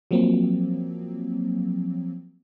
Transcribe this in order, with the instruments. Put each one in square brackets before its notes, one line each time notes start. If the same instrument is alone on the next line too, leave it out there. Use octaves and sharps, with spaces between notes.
[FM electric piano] F3 F#3 A#3 C4